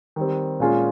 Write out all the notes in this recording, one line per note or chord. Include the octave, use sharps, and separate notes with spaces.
D#3 G3 C4
A#2 G#3 C#4 F4 G#4